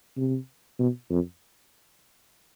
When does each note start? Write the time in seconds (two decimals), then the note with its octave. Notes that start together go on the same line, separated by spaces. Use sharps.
0.17 C3
0.79 B2
1.10 F2